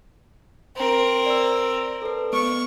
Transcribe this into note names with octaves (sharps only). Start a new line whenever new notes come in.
C4 A#4
D5 E6
A4 B4
A3 B3 C#6 D7